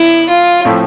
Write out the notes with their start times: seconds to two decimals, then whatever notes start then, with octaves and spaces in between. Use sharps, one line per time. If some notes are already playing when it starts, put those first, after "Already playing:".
Already playing: F#2 D3 B3 E4
0.29 F4
0.65 A2 F3 A3 C4 E4